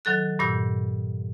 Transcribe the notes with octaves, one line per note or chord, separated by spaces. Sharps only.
D#3 F#3 A4 F#6
G2 A#2 E6 G6